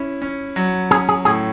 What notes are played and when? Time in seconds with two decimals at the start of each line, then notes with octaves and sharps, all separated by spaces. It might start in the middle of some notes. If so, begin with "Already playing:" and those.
Already playing: C#4 E4
0.22 C#4
0.56 F#3
0.91 C#4 G#4
1.09 G#4
1.25 A2 G#4